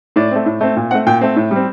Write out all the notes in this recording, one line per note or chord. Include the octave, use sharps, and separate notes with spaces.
A2 D5
A3 C4
A2
A3 C4
A#2
A3 C4 F#5
A#2 G5
A3 C4
A2
G3 C4